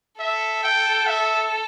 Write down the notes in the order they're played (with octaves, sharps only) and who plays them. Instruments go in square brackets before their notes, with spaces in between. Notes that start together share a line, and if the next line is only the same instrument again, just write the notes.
[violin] A4 [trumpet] E5
[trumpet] G5
E5